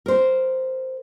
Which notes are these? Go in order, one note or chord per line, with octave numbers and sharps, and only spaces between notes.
A#4 C5